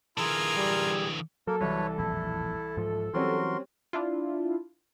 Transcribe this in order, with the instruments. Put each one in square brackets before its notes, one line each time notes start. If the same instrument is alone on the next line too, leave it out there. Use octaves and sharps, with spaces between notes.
[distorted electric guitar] D3 E3 [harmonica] F4 A#4 [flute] G#4
[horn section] G3
[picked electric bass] F#3 [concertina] A#3 A#4 [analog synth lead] A4
[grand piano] C2 E3 [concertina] B4 C#5
[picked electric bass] E1 A#1 F2 [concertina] E4
[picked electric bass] G#2 F3
[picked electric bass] E3 F#3 [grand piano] G3 C4 C#4 [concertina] F#4 A#4 C6
[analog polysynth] D4 E4 F4